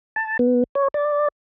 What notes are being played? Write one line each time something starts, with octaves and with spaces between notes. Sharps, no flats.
A5
B3
C#5
D5